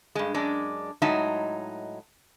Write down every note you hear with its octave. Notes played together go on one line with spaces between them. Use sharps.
G2 G#3
F#2 G#3 D4
A2 F#3 G#3 D#4 E5 A5